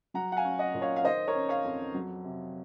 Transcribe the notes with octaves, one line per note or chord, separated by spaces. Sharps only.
F#3 F#5 A#5
F#5
F5 G#5
C#4
D#5 F#5
A#2
C#5 F5
F5
D#3 C5 D#5
A#4 C#5
C#4
C#5 F5
F2
F#3
C3